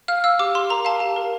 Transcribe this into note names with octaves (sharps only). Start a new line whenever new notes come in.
F5 F6
F5 E6
G4 D6
G4 C6
A#4 A#5
F5 A5
G4
A#4